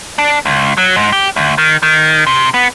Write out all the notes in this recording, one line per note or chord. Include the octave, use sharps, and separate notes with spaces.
D4
C#2
F#3
G#2
G4
D2
D#3
D#3
C3
B3